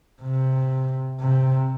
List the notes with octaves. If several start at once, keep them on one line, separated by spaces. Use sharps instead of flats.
C3
C3